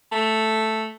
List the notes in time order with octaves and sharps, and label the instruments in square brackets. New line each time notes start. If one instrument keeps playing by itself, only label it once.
[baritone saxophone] A3